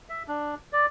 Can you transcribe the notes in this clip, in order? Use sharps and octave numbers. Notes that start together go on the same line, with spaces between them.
E5
D4
D5